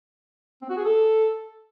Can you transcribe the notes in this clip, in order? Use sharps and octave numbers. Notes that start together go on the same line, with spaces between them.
C4
F#4
G#4
A4